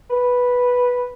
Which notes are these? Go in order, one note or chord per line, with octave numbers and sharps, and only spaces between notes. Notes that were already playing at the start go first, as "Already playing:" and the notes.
B4